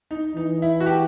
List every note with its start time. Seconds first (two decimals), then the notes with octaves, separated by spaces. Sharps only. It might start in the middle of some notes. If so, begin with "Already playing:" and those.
0.11 D#4
0.36 E3 D#4
0.62 E4
0.80 F#4
0.86 G4